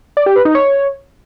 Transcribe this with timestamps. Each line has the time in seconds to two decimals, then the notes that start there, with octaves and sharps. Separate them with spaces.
0.17 D5
0.26 G4
0.36 B4
0.45 D#4
0.55 C#5